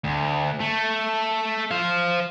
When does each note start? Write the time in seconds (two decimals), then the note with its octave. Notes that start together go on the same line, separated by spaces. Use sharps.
0.04 D2
0.60 A3
1.71 C5 F5